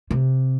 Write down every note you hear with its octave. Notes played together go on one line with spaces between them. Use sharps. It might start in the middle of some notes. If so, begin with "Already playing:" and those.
C3